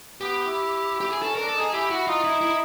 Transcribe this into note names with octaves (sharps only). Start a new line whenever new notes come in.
B3 G4
E4
G4
G#4
C#4 A4
D4 A#4
A4
D#4 G#4
E4 G4
E4 F#4
D#4 F4
E4
E4